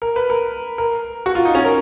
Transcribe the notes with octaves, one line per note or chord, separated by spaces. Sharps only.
A#4
B4
A#4
A#4
F#4
F4
D#4
C#4
A#4